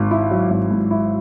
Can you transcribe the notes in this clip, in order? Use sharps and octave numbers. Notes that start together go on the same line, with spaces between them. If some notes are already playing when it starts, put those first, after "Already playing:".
Already playing: G#1 G#2
E4
F#3
G#1
G#2
E4